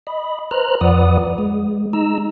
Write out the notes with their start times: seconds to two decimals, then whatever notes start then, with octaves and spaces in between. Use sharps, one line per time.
0.07 D#5 B5
0.51 B4 C5 A#5 F6 F#6
0.81 F2 F3 B4 D5 F#5 D#6
1.38 G#3
1.93 G#3 D#4 A#5 E6